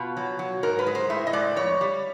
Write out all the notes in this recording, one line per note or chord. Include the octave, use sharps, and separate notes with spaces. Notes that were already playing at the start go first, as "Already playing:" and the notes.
Already playing: B2 F4
F#3
F#3
G#2 A#4
B4
G#3
C5
A2 E5
D#5
G#3 D5
F2 C#5
G3